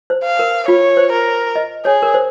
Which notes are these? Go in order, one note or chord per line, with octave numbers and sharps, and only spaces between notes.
C5
F5
A#4
F4 C#5
C5
A#4
D#5
G#4 C#5
A#4
C5